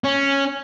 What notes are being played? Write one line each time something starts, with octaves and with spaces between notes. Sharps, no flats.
C#4